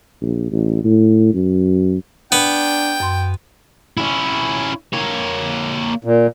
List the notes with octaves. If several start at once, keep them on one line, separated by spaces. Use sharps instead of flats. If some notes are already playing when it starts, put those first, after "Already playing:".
A#1
A1
A2
F#2
B3 D4 G5
F#2 C6
C#4 E4
A#3 C#5
A#2